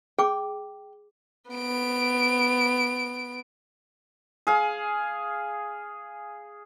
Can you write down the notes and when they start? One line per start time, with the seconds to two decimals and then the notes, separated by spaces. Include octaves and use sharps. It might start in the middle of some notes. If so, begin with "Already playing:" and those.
0.19 G#4 G5 D6
1.51 B3 D7
4.47 G#4 F5